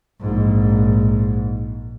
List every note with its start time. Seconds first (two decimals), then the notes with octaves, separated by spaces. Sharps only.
0.21 A#1 G#2